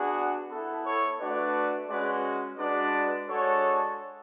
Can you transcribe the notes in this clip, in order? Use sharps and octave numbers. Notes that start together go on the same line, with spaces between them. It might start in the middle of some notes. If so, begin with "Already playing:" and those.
Already playing: B3 D4 F#4 G#4
B3 E4 A4
A4 C#5
A3 D4 F#4 B4 D5
G#3 C#4 F#4 B4 D5
G#3 D4 F#4 B4 D5
G#3 D4 F#4 A4 C#5